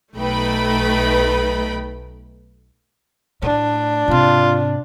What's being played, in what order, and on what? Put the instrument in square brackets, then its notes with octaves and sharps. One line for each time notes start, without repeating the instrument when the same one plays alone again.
[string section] B1 A3 D#4 B4 G5 B5
[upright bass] A2 [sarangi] D4
[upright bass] G#2 C3 [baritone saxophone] F4